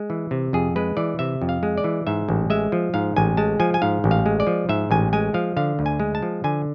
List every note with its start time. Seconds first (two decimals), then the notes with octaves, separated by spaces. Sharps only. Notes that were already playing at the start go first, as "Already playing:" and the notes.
Already playing: G#3
0.10 E3
0.31 C3
0.53 F2 G#4
0.76 G#3 B4
0.97 E3 D5
1.19 C3 E5
1.42 F2
1.49 F5
1.63 G#3
1.78 D5
1.84 E3
2.07 G#2 E5
2.29 A1
2.50 G#3 E5
2.72 F3
2.94 G#2 F5
3.16 A1 G#5
3.37 G#3 A5
3.60 F3 G#5
3.74 G#5
3.82 G#2 F5
4.04 A1
4.11 F5
4.26 G#3
4.40 D5
4.47 F3
4.69 G#2 E5
4.91 A1 G#5
5.13 G#3 G#5
5.34 F3 F5
5.57 D3 F5
5.79 D2
5.86 G#5
6.00 G#3
6.15 A5
6.22 F3
6.44 D3 G#5